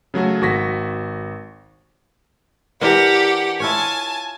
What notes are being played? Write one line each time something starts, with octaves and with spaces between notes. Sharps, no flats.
C#3 F#3 A3 F#4
G#1 F#4 C#6 A#6 B6
E3 D4 G4 A#4 F#5
E4 F4 C#5 G#5 A5